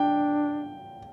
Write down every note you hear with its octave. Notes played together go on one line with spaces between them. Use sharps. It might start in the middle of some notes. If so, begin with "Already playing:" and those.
Already playing: D4 G5